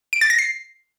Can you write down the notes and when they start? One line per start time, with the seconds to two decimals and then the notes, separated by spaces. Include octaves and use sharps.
0.13 D7
0.21 A6
0.30 A#6
0.39 C7